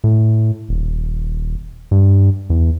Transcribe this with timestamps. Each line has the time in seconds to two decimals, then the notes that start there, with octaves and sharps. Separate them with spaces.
0.04 A2
0.69 D#1
1.91 G2
2.50 E2